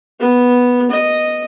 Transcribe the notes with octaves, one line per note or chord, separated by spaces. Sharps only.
B3
D#5